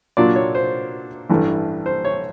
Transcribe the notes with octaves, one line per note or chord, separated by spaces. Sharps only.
A#2 F#3 A#3 D4 F4 D5
C#5
C5
A1 G2 E3 A3
C5
C#5